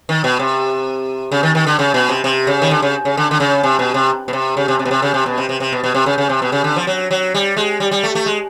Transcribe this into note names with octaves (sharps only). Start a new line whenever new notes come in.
D#3
B2
C3
C#3
D#3
D#3
D3
C#3
B2
C3
C3
C#3
D#3
D3
C#3
C#3
D3
D3
C#3
C3
B2
C3
B2
C3
C#3
C3
C3
B2
C3
C#3
C3
B2
C3
C3
C3
B2
B2
C3
C#3
C#3
C3
B2
C#3
D3
F3
F#3
F#3
G3
G#3
G3
G3
A3
A3
G#3